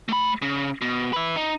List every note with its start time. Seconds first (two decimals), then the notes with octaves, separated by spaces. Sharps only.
0.08 A3 B5
0.42 C#3
0.82 B2
1.13 B4 E5
1.36 D#4